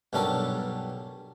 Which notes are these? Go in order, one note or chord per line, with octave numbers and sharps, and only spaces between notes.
B1 G2 G3 C#4 A4 A#4